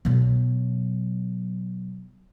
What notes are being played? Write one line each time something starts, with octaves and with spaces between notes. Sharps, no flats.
B2 F#3